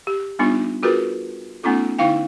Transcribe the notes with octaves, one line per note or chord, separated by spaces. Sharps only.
G4
G3 B3 D4 D#4 F4
F4 F#4 G#4 A#4 B4
A3 B3 C#4 D#4 F4 A4
D3 D#4 E4 F5 G5